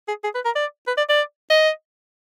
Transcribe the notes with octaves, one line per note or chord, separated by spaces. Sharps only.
G#4
G#4
B4
A#4
D5
B4
D5
D5
D#5